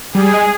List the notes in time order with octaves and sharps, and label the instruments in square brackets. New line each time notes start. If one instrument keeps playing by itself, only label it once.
[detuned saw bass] G3 [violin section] G#4
[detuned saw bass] G#3